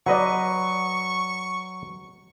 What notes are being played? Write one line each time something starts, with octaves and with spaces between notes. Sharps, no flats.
F#3 B4 D5 D#5 F#5 C#6